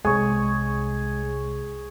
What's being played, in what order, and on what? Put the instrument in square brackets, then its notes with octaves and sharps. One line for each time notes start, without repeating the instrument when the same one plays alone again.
[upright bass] C2 [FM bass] G#3 [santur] G#4 C#5